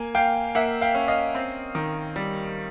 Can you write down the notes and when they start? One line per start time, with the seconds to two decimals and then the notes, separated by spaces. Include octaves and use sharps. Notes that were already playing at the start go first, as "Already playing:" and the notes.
Already playing: A#3 G#5
0.15 A#3 F5 G5
0.55 A#3 E5 F#5
0.81 F5 G5
0.95 C#4
1.08 D#5 F5
1.35 C4
1.75 D#3
2.16 G3